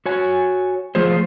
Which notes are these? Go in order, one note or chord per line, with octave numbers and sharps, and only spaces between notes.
F#4 C#5 G#5
F3 A3 F4 G#4 C5